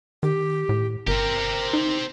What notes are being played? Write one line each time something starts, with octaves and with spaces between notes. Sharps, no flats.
D#3 G4
A2
G1 C4 G4 A#4
D#4